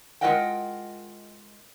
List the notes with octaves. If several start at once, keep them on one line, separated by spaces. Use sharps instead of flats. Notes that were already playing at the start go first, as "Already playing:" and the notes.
G#3 F4 A#4 D#5 F#5 G5